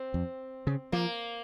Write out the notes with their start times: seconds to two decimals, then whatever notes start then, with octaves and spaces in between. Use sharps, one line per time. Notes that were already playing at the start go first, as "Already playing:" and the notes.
Already playing: C4
0.14 F2
0.67 C#3
0.92 F3 A#3